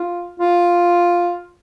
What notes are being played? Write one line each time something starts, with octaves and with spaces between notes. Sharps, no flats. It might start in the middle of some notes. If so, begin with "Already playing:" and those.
Already playing: F4
F4